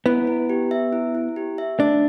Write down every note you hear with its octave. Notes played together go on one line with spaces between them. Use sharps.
B3 E4
E4
G4
E5
E4
E4
G4
E5
A3 D4